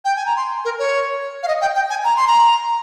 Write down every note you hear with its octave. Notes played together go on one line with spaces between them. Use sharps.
G5
G#5
A#5
C6
A#4
C#5
F5
D#5
G5
G5
G#5
A#5
C6
A#5